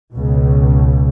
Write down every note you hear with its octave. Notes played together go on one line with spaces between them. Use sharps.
C#2 B2